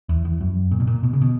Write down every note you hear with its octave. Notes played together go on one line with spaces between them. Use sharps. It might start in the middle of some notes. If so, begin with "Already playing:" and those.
E2
E2
F#2
A#2
B2
A#2
B2
C#3
B2